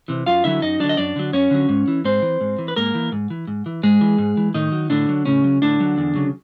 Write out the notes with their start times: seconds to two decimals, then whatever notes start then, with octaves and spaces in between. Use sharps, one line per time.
0.08 C3 E3
0.26 F#2 F4 F5
0.44 D3 F#3 E4 E5
0.62 F#2 D#4 D#5
0.80 D3 F#3 D4 D5
0.89 D#5
0.97 F#2 D4 D5
1.16 D3 F#3
1.33 F#2 C#4 C#5
1.51 D3 F#3
1.69 G#2
1.88 E3
2.04 G#2 C4 C5
2.22 E3
2.41 G#2
2.58 E3
2.68 B4
2.76 G#2 A#3 A#4
2.95 E3
3.12 G#2
3.30 E3
3.47 G#2
3.66 E3
3.83 G#2 G#3 G#4
4.01 E3
4.18 G#2
4.37 E3
4.54 A2 D#3 D#4
4.72 F#3
4.90 A2 D3 D4
5.09 F#3
5.25 A2 C#3 C#4
5.44 F#3
5.62 A2 D3 D4
5.80 F#3
5.98 E2
6.15 C#3 F#3